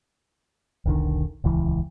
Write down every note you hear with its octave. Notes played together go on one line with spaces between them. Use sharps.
E1 B1 D3 D#3
D#1 C#2 E3